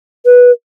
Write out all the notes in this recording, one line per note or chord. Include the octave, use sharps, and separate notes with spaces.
B4